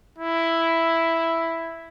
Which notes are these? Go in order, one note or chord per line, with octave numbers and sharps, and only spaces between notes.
E4